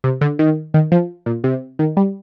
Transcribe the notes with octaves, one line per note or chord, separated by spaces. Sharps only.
C3
D3
D#3
D#3
F3
A#2
C3
D#3
G3